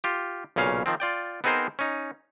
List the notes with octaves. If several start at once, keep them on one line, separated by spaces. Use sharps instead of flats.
F4 G4
B1 A#2 C#3 C#4 F5
D#3 F3 C4
F4 D5 G5
B3 C4 D#4 G#4 A#4 C5
C#4 D#4